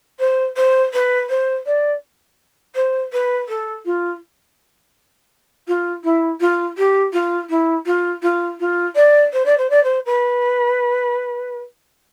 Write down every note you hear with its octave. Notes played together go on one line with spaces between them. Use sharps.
C5
C5
B4
C5
D5
C5
B4
A4
F4
F4
E4
F4
G4
F4
E4
F4
F4
F4
D5
C5
D5
C5
D5
C5
B4